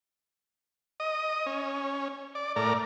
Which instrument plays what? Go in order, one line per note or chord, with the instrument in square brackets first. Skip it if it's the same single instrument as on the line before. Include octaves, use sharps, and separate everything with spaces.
[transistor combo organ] D#5
C#4
D5
A2 A#4 D5